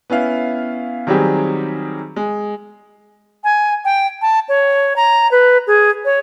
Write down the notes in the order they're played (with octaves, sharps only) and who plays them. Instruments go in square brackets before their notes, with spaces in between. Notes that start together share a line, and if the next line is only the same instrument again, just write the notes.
[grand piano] B3 C#4 E4 F5
D#3 F#3 G3 C4 G4 G#4
G#3
[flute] G#5
G5
A5
C#5
A#5
B4
G#4
C#5